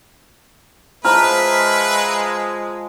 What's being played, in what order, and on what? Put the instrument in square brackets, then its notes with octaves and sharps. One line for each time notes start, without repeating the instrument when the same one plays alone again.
[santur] F3 D#5 E6 [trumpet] G#3 [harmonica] B4 E5 [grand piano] A#5 F6